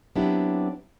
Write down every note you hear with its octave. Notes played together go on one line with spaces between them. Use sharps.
F#3 B3 C4 D4 E4 G4